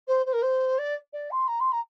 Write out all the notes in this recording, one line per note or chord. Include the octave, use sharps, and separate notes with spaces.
C5
C5
A#4
C5
D5
D5
C6
A#5
C6
A#5